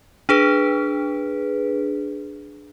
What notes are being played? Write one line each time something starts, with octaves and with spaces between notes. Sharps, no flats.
D4 G#4 B4